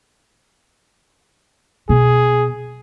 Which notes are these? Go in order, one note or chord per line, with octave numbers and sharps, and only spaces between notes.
B2 G#4